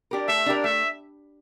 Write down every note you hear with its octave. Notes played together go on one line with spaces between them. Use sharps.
D4 G4 A#4
A3 E5
D4 G4 A#4
A3 E5